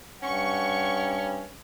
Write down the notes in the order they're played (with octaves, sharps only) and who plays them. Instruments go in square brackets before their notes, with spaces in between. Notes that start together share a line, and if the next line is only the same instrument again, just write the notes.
[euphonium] G2 [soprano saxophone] C#4 [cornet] F#5 [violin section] C#6